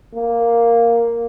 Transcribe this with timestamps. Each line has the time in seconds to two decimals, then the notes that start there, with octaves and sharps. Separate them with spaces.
0.14 A#3